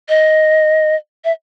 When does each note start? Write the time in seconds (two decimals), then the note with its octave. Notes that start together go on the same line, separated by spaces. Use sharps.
0.09 D#5
1.25 E5